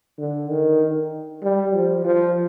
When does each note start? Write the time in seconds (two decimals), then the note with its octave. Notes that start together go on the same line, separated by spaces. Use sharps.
0.19 D3
0.50 D#3
1.43 G3
1.74 F3
2.05 F3